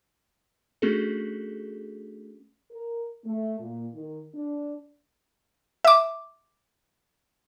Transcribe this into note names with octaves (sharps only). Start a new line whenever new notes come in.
A3 C#4 D4 F#4 G#4 A4
A#4
A3
A#2
D#3
D4
E5 D6